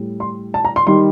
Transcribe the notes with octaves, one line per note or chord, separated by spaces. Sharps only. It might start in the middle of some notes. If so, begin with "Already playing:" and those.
Already playing: A2 G3
C6
A5
A#5
C6
D#3 G3 C6